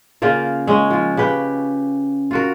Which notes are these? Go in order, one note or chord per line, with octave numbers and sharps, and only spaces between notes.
C#3 A#3 F4 A#4
G#3 C#4 D#5
F3 F4
C#3 G4 B4 G5
F4 F#4 A#4